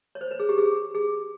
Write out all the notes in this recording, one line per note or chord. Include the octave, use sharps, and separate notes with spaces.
C#5
C5
B4
G#4
G4
G#4
G#4